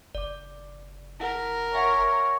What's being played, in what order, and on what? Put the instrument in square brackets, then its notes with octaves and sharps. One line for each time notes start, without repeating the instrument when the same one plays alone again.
[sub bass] F#1 [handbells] D5 D6
[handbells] E4 F#5 [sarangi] A#4
[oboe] C#5 [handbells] E5 F#5 G#5